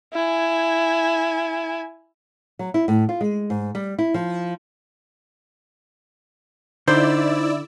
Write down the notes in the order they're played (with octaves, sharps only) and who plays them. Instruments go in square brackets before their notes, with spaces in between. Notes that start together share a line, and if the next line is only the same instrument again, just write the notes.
[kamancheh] E4 G#5
[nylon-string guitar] F#3
E4
A2
F4
G#3
G#2
G3
E4
F3
[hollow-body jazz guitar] D3 [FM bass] D#4 [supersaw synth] E4 D5 E6 [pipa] C5